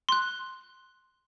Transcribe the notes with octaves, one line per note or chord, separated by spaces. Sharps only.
C6 F#6